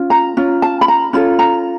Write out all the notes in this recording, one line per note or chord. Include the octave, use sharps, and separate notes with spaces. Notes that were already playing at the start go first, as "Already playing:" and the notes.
Already playing: C#4 F4
A#5
C#4 F4
A5
B5
A#5
C#4 F4 A4 B5
A#5